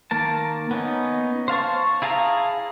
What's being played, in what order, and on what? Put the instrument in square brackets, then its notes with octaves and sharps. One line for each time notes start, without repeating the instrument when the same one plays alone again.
[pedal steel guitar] D#3 A#3 A#4 A5
B3 C#4 D#4
C5 F5 A5 C#6
E4 G#4 F5 A5 A#5